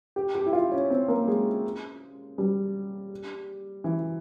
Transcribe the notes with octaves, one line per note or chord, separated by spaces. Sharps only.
G4
G4
E4
F4
C#4
C4
A#3
G#3
G3
E3